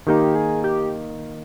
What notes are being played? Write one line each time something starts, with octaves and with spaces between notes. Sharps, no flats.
D#3 A#3 D#4 G4
G#4
G4